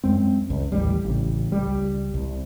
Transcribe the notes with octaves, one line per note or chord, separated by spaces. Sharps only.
F#2 G#3 C4
C#2
A1 D#2 G3
A1 C#3
C#2 G3
C2